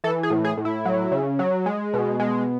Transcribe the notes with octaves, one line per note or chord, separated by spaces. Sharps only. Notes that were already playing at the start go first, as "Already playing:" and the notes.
E3 A4
G#4
A2
G#4
A2
E4
F#3
C#3
F#3
G#3
B2
G#3